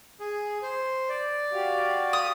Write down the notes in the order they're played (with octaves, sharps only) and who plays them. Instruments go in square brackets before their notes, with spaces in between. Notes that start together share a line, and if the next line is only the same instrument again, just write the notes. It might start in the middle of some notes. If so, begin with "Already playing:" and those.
[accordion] G#4
C5
D5
[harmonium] F#4 G4 F5
[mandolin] D#6